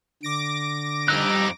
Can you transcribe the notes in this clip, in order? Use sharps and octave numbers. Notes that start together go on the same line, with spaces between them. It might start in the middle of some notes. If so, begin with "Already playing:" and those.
D3 D6 A#6 D7
F2 G3 D#4 E6 F#6